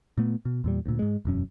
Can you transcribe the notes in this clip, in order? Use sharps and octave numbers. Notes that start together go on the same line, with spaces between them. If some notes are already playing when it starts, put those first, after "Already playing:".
A#2 A3 B3
B2
E2 A#2 G3
D2 A#2
G#2 G#3
E1 F#2 C#4